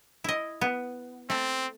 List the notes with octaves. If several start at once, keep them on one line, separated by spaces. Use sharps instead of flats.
E4 D#5
B3
A3 C4